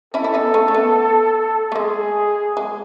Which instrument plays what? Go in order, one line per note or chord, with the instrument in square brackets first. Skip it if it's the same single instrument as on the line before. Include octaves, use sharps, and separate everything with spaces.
[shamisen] C#4 E4 [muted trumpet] A4
[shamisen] E4
B3 D#4
A3 C#4
A3
B3
A3
[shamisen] G#3 [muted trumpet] G#4
[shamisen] G#3